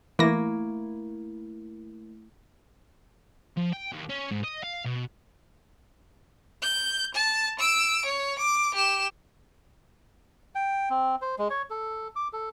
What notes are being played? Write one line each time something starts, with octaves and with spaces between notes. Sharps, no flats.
E3 A3 A#3 E4 A#6
F3
G5
D#2
C#4
G#2
D#5
F5
B2
G6
A5
E6 D7
C#5
D6
G4 E7
G5
C4
C5
G#3
C#5
A4
D6
A4